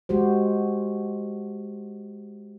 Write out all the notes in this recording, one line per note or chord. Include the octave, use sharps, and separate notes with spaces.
G#3 F#4 G4 C5